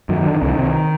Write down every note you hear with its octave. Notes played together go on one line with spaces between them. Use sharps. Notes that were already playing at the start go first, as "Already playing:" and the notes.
F#2 D#3
D3
D#3
C2 D3
D#3
C3
D#3